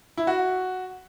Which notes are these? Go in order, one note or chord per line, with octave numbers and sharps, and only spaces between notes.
E4
F#4